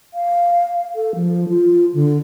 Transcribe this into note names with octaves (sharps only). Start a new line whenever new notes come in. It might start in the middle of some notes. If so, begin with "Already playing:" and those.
F5
A4
F3
F4
D3